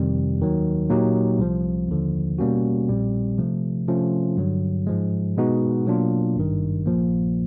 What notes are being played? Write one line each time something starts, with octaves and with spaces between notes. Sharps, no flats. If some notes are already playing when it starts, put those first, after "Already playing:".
Already playing: F2 C3 D#3 G3
D#2 D#3 F#3
A#2 F#3 A#3 D#4 G4
C2 C3 F3
D#2 D3 F3
B2 G3 A#3 C#4 F#4
A#1 A#2 G3 C4
C3 F3 A3
C3 F3 A3 C#4 F4
G2 D3 F#3
G#2 F3 G#3
B2 G#3 B3 D#4 F#4
B2 F#3 A#3 D4 F4
G#1 G2 D#3
A#1 A#2 F3 A#3